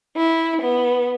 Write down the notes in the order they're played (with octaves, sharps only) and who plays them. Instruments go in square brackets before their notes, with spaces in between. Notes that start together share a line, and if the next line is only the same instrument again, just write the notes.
[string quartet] E4
B3